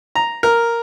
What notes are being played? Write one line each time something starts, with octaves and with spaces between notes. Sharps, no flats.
A#5
A#4